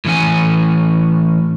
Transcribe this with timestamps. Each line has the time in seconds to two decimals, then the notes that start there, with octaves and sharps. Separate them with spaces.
0.05 A2 E3 C#4 G#5